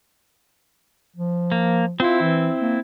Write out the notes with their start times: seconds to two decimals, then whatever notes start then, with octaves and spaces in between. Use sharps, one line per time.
1.16 F3
1.52 A#3
2.00 C4 E4 F4
2.21 E3
2.61 A#3